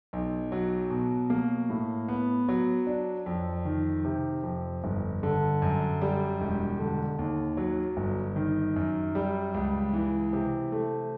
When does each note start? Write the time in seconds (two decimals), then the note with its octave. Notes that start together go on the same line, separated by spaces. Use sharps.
0.13 B1
0.52 F#3
0.90 B2
1.30 A#3
1.70 A2
2.08 B3
2.49 F#3
2.87 D4
3.26 F2
3.65 D#3
4.05 C3
4.43 F2
4.84 G1
5.23 D3
5.62 F#2
6.02 G3
6.41 E1
6.79 D3
7.19 D#2
7.57 F#3
7.97 G1
8.36 D#3
8.76 F#2
9.15 G3
9.54 C#2
9.93 E3
10.33 C3
10.72 A3